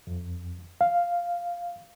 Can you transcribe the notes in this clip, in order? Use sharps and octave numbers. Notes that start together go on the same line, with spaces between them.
F2
F5